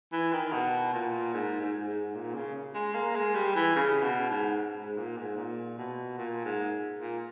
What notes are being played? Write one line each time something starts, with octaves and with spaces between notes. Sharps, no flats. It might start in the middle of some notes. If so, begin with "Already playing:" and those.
E3
D#3
B2
A#2
G#2
G#2
G#2
A#2
C#3
G#3
A#3
G#3
G3
E3
C#3
B2
G#2
G#2
A#2
G#2
A#2
B2
A#2
G#2
A#2